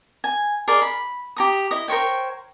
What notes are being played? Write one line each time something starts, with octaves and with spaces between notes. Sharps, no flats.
G#5
G#4 A#4 D5 D#5
B5
G4 A#5 D#6
E4 D#5
A#4 C5 C#5 G5